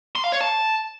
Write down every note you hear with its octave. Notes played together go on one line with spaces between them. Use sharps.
C6
F5
C#5
A5